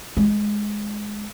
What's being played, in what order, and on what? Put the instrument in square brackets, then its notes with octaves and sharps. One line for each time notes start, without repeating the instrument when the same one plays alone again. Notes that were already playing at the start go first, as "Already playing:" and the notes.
[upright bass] G#3